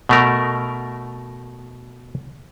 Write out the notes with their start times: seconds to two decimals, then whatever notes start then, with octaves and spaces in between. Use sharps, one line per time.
0.09 B2 A3 A#4